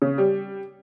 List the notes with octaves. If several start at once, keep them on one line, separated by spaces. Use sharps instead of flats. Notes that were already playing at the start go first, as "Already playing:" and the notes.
C#3
G3